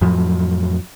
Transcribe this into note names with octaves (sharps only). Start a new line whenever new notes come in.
F2 A2 F3 F#3